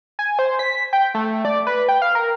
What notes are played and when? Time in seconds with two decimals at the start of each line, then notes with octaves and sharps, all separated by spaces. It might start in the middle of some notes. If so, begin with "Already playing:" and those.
0.19 G#5
0.39 C5
0.59 B6
0.93 G5
1.15 A3
1.45 D5
1.67 B4
1.88 G5
2.02 F5
2.15 A#4